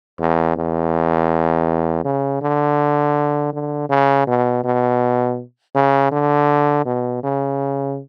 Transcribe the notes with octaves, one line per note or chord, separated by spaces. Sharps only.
E2
E2
C#3
D3
D3
C#3
B2
B2
C#3
D3
B2
C#3